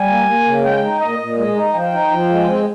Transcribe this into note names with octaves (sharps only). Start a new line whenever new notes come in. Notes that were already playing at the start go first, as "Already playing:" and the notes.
Already playing: G3 G#5
A#3
A#3
C#3
G#3 G5
D#4
A#2 D#5
A#2
G#3 D#5
D#4
F3 G5
D#4
F3
G#3
C4